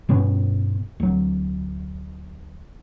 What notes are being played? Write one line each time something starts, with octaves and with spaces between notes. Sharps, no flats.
G2 B2 B3 C#4
D2 F#3